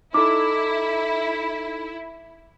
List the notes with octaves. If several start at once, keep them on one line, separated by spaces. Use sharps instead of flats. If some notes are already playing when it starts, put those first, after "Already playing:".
D#4 E4 A4 D6